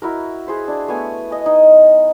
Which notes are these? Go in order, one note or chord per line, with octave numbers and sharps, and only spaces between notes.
E4 F#4 A#4
F#4 G#4 C5 B5
D4 E4
A3 B3 G#5 C#6
D#5 G#5
D#4